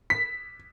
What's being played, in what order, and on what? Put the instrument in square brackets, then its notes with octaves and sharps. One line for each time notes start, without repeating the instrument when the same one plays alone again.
[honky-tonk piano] B6